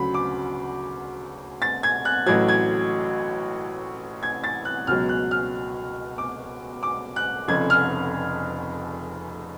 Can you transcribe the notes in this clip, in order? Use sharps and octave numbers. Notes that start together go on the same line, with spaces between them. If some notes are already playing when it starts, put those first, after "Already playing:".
Already playing: D2 C#3 F#3 B5
D6
A6
G#6
F#6
A1 A2 F#3 G#6
G#6
G#6
A6
F#6
C#2 B2 F#3 F6
F#6
F6
D6
D6
F#6
F1 F2 C#3 G#6
F6